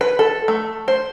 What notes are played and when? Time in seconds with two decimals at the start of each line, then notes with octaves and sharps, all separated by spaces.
0.01 B4
0.19 A4
0.48 A3
0.88 C5